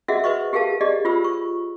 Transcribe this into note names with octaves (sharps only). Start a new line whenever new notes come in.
F#4 G#4 D#5 E5 F#5 E6
B4 C5 D#5 C#6
G4 G#4 A#4 F5 A5
G4 G#4 D5 D#5
F4 G4 C5 B5 E6
C#6